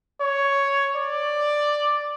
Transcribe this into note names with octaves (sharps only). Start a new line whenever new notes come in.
C#5
D5